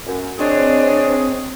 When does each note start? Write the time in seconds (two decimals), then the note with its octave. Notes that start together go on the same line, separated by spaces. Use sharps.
0.06 F#2
0.39 C4 D4 G#4 C#5 D#5